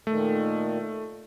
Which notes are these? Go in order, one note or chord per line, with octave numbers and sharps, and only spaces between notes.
A#2 D#3 A3